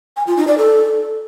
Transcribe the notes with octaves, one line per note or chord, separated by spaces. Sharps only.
G#5
F4
D#4
D5
A4